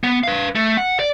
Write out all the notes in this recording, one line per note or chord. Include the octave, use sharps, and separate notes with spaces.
B3
B4 F5
A3
F#5
D5